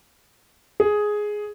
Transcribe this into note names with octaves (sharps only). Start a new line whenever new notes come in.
G#4